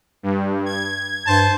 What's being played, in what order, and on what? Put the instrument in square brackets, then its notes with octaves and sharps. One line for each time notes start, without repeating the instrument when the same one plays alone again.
[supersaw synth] G2
G#6
[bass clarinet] G2 [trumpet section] C5 A5